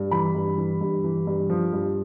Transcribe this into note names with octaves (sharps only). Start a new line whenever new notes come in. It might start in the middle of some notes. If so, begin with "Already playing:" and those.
Already playing: G2
E3 B5
G2
E3
G2
E3
G2
F3
G2